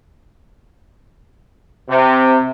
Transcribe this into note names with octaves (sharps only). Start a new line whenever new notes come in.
C3